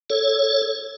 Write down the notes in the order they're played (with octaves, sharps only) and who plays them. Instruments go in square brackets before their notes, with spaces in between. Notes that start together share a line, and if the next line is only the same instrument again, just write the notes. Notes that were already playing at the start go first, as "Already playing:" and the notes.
[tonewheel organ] A4 C#5